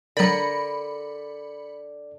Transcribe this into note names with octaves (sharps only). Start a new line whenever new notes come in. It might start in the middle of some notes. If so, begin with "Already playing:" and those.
D3 F#3 A#4 D5 B5 A6 C#7